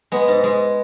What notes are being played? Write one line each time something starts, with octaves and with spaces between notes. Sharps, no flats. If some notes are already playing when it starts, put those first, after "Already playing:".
G#3 B3
G#2
G#3